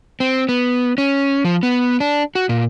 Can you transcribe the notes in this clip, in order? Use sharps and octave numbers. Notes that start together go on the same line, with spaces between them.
C4
B3
C#4
F3
B3
D4
F#4
A#2